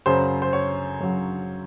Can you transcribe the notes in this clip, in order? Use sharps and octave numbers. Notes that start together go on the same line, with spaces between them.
F#2 C#3 F#3 C5
C5
C#5
F#2 C#3 F#3